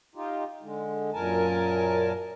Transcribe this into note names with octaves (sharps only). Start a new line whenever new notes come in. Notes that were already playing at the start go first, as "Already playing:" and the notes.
D#4 F4 G4
D3 G#3
F#2 A#2 A#4 G#5 A5